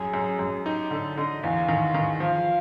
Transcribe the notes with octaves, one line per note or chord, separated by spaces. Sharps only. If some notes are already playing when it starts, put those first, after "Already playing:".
Already playing: F#2 G#4
F#2
F#2
D#4 G4
D3 A4
D3 D#5
E2 F5
D#3
D#3
F3 F5